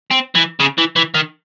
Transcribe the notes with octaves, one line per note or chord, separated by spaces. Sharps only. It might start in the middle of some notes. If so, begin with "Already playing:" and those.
C4
E3
C#3
E3
E3
D#3